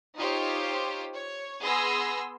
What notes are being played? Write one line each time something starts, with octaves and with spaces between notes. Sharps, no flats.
D#4 F4 G4 C5 C#5
C#5
B3 G#4 C6 E6 A#6